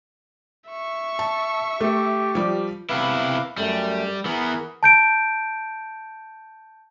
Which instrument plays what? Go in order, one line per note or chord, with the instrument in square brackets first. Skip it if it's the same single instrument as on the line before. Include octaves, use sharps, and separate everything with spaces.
[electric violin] E5 C#6
[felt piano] A5
[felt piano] A3 [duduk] G4
[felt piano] F3 G3
[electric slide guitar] C3 B3 E4 [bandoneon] B4 F5 D6
[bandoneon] F#2 A3 [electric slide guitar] G3
[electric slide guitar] E3 B3 [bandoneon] G#4 A#4 B5
[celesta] A5 G6 D7